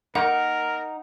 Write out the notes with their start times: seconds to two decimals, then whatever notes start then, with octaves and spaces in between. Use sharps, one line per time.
0.15 A#3 D#4 A#4 F#5